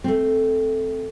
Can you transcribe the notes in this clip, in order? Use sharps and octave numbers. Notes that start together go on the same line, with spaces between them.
A3 C4